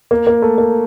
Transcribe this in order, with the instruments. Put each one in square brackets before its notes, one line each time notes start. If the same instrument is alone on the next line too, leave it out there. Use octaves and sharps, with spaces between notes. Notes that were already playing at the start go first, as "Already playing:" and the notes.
[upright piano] A#3
A#3
A3
A#3